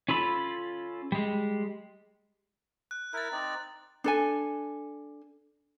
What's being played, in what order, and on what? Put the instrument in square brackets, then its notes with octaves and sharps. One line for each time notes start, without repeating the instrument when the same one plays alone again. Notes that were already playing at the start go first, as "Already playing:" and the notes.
[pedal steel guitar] C#4 F4 A4 B5
G3 G#3
[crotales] F#6
[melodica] E4 A#4 [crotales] F#6 A6
[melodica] C4 D#4 D5
[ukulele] D4 A4 G#5